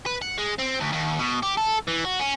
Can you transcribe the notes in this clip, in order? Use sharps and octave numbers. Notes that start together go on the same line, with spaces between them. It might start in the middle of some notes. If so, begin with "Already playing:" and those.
B4
F#5
G#3
C4
D2
D#2
B2
G4
A4
E3
F#4
C#4